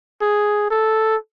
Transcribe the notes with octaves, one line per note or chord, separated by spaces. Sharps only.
G#4
A4